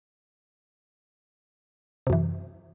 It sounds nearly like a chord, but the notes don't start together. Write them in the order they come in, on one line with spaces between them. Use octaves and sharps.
C3 F#2 E3